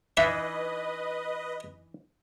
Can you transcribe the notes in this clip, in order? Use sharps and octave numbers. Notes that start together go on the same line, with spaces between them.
E3 D4 D#4 B4 D#5 E5